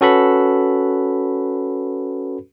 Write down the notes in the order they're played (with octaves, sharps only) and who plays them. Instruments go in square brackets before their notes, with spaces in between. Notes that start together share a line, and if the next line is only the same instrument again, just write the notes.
[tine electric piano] C#4 F#4 A4 B4 B5